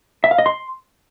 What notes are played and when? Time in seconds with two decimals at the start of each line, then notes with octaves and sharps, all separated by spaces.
0.24 E5
0.31 F5
0.38 D#5
0.46 C6